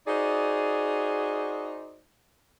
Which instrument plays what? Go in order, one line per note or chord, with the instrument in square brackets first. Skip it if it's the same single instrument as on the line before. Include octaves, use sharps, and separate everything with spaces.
[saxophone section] D#4 F#4 G#4 C5 D5